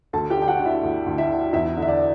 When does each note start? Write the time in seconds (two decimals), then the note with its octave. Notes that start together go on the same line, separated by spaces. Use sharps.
0.13 D2 A4 A5
0.30 G4 G5
0.37 D3
0.42 G5
0.48 F#4 F#5
0.60 D3
0.65 E4 E5
0.83 D2
1.06 D2
1.18 E4 E5
1.29 D3
1.53 E2 E4 E5
1.77 D3
1.82 E5
1.88 D4 D5